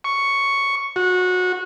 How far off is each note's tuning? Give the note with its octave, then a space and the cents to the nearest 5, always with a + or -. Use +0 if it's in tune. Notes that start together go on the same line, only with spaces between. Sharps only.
C#6 +5
F#4 -20